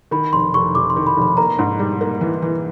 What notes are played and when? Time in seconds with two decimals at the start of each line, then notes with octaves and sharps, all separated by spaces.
0.11 D#3 B5
0.33 F1 C6
0.53 F1 C#6
0.74 F1 D6
0.90 C6
0.96 D#3
1.07 B5
1.17 F1
1.22 B5
1.37 A#3 A#5
1.59 G#2
1.79 G3
2.01 A#3
2.21 E3
2.42 E3